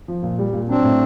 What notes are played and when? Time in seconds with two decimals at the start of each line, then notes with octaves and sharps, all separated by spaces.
0.08 F3
0.23 A#2
0.39 G3
0.53 A#2
0.69 F#3 C4 D4
0.84 A2